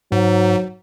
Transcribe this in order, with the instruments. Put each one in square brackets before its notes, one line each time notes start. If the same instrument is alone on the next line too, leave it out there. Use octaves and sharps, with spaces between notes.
[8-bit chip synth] G#2 [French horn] F#3